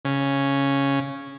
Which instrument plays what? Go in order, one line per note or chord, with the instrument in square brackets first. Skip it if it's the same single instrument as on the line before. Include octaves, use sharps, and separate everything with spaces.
[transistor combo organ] C#3